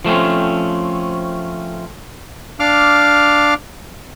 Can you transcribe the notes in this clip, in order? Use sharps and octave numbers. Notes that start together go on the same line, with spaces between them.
F3 A3 C4 C#4
D4 F5 D6 F6